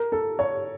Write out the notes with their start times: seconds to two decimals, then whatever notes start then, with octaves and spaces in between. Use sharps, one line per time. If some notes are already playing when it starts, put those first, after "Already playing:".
Already playing: A#4
0.12 A4
0.39 C#5